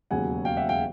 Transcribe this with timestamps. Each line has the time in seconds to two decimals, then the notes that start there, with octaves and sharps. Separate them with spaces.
0.11 E1 D#2 C#3 F#3 F#5 G#5
0.45 F5 G5
0.57 E5 F#5
0.69 F5 G5